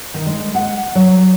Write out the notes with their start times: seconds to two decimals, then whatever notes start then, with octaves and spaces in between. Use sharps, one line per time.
0.14 D#3
0.27 G#3
0.55 F#5
0.95 F#3